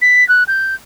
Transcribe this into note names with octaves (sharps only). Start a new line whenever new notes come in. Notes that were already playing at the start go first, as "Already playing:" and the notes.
B6
F#6
G6